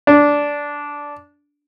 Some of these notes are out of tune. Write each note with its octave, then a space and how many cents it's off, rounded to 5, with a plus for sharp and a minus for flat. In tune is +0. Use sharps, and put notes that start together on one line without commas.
D4 -10